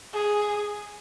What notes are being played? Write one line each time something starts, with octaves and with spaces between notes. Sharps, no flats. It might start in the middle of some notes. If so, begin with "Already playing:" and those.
G#4